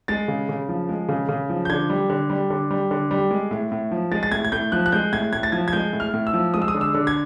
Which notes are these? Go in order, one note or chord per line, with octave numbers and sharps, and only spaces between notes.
G#3 A6
C#3
C#3
F3
G#3
C#3
C#3
F3
G6
D3 G#6
G3
D3
G3
D3
G3
D3
G3
G#3
A2
A2
F3
G#3 A6
A6
A2 G#6
G#6
A2 G6
F3 F#6
F#6
G#3 G6
A2 G#6
A2 G#6
A6
F3 G#6
G#6
G#3 G6
A2
F6
A2
E6
F3
G#3 D#6
E6
D#6
D3
E6
D3
G#6